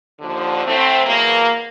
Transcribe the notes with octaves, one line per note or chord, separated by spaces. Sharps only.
D#2 D3 F3
A2 F#3 A3 C4 E4
E2 B2 F#3 A#3